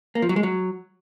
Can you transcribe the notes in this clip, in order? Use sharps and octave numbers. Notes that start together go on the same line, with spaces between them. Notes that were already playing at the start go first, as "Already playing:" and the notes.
A#3
F3
F#3
G#3
F#3